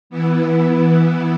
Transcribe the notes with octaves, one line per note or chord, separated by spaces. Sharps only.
E3 B3 E4